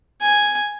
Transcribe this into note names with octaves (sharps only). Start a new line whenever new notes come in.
G#5